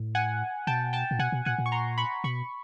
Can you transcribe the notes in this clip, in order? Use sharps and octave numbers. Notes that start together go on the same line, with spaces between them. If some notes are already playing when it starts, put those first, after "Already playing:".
Already playing: A2
F#5 G#5
B2 G5 A5
G5 A5
A#2
B2 F#5 G#5
B2
A#2 F#5 G#5
A#2
C#6
A#5 C6
B5 C#6
B2 B5 C#6